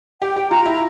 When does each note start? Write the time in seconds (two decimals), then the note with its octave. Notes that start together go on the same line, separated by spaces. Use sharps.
0.22 G4 G5
0.36 G4
0.50 F4 A#5
0.65 E4